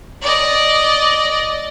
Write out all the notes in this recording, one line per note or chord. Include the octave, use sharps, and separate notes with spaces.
D5 D#5